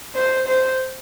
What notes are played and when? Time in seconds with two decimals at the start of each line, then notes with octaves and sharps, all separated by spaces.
0.15 C5
0.47 C5